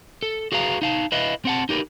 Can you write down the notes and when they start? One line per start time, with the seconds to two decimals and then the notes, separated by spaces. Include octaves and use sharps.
0.23 A4
0.52 F#4 G#4 B4 F5 A#5
0.82 D#4 F5 A5
1.12 E4 B4 D#5 F5
1.45 C4 F#5 A5
1.69 D#4 G4 A#4 B4